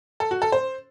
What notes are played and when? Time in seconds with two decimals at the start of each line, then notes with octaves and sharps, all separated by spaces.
0.20 A4
0.31 F#4
0.42 A4
0.52 C5